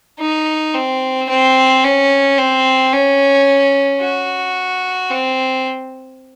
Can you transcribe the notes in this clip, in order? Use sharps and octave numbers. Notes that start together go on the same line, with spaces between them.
D#4
C4
C4
C#4
C4
C#4
F#4
C4